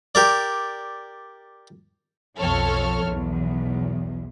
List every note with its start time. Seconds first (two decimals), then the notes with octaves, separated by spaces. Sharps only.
0.15 G4 A#4 D5
2.38 B1 F2 F3 A4 C#5 F6
3.02 B1 E2